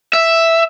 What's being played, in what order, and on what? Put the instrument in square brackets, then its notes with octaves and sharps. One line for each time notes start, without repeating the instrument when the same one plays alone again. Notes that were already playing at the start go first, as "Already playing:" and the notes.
[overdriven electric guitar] E5